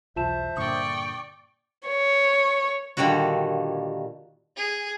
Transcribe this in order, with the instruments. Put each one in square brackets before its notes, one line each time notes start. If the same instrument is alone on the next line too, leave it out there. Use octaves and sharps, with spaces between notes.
[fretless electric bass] B1 E2 [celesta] F4 A5 E7 [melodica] C5 E5
[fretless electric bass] G2 A#2 D3 [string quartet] D5 G5 C#6 [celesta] D#6
[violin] C#5
[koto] A#2 D3 D#3 G3 F#4
[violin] G#4